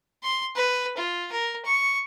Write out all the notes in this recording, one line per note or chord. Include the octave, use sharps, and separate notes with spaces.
C6
B4
F4
A#4
C#6